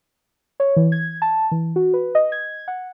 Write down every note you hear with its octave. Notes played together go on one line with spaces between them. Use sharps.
C#5
E3
G#6
A5
E3
F#4
B4
D#5
G#6
F#5